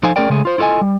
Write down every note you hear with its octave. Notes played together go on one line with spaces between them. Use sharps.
F3 D#4 A4 C5 F5 G#5
A3 C#4 G#4 A#4 D5 G5
C#3 G#3 A3 G#4
F4 C5
E4 F4 A4 D#5 G#5
G3